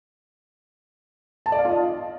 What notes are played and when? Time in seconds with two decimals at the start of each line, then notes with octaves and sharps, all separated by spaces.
1.46 A5
1.52 D5
1.58 F5
1.65 F4
1.71 D#5